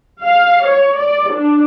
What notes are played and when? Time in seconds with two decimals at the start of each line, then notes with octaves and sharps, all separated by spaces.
0.23 F5
0.66 C#5
0.98 D5
1.34 D4